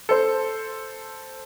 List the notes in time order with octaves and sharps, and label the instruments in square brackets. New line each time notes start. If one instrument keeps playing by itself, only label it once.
[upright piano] A4 C5